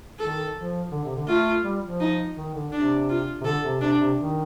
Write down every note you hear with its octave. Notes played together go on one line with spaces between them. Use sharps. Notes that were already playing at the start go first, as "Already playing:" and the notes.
D#3 A4
F3
D3
C3
D3
A3 F4
G3
F3
D#4
D#3
D3
C3 D4
F4
C3
D3 A4
C3
C3 D4
C3
D#3